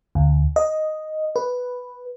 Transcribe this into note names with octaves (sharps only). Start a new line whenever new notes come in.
D2
D#5
B4